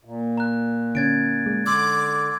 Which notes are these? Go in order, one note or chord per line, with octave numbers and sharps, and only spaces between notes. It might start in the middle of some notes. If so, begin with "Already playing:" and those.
A#2
A#5 F#6
D3 C#4 G#6 A6 D7
G#3
D3 C6 D6 E6 G#6